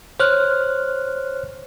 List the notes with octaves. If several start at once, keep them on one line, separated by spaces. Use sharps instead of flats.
C5 C#5 F6 F#6